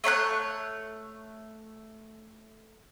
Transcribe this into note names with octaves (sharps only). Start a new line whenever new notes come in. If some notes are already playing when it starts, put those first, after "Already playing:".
A3 C#5 B5 F#6